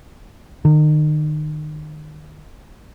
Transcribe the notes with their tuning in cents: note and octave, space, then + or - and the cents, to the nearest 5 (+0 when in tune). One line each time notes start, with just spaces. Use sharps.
D#3 -35